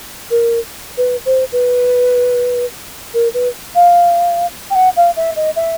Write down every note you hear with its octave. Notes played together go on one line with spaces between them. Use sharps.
A#4
B4
C5
B4
A#4
B4
F5
G5
F#5
F5
E5
D#5
E5